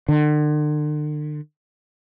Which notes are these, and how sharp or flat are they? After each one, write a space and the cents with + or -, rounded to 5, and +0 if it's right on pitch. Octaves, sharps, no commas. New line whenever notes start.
D3 +40